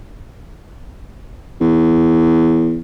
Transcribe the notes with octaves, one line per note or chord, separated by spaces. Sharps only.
E2